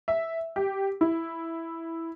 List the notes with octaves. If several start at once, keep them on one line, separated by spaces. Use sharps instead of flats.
E5
G4
E4